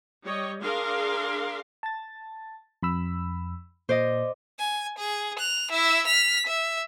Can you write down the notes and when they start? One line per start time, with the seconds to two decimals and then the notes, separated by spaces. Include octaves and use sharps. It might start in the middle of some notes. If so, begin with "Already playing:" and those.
0.24 G3 C#5 D#5
0.61 D4 G#4 A#4 F5 C6
1.83 A5 A6
2.83 F2 B5 E6
3.89 A#2 C5 D5 D#5
4.59 G#5
4.98 G#4
5.39 F#6 F7
5.71 E4 E5
6.07 F6 B6
6.47 E5